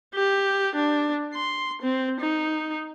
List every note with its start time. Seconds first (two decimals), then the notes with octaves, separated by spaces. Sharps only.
0.15 G4
0.76 D4
1.34 C6
1.82 C4
2.20 D#4